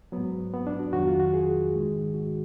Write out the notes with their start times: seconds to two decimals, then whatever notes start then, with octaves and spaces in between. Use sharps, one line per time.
0.12 G#2 F#3 B3
0.53 B3
0.67 D4
0.79 F#4
0.93 F2 D#3 F#3 F#4
1.07 F4
1.20 F#4
1.34 G#4
1.74 G#2 D#3 G#3
2.14 F#4